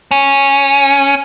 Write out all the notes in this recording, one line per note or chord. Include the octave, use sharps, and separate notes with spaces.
C#4